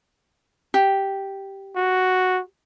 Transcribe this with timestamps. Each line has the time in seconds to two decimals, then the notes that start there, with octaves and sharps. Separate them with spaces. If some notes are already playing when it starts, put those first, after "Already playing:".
0.74 G4
1.76 F#4